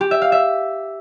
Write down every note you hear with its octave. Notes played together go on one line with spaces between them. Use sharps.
G4
E5
F5
E5